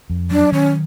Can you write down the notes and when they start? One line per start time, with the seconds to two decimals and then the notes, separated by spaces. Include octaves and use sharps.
0.10 F2
0.31 F#3 D4
0.52 D#3 C#4